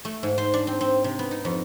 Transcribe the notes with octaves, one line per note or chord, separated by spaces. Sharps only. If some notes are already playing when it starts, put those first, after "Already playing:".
A3
G#2
C5
D4
C4
C4
C3
B3
D#4
F2